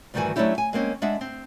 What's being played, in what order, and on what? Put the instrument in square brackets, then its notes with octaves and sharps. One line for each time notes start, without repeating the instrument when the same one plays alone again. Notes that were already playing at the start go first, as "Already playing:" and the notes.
[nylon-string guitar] D2 G2 D#3 E3 F#4 G#5
F#3 A3 C#4 D4 E4 G4
G#5
G#3 A#3 C4 C#4
G#3 D4 E5 F#5
C4